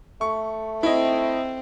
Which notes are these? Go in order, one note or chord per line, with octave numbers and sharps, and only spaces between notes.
A3 C#6
C4 E4 D#5